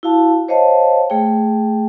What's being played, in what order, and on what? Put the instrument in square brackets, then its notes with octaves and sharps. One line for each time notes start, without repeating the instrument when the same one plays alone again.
[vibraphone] E4 F#4 F5 A5
C5 C#5 D#5 F5 A5
A3 G#4 G5